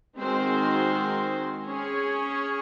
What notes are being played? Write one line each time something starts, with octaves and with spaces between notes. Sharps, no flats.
D#3 G#3 C4 F#4 C5
C#4 G#4 C#5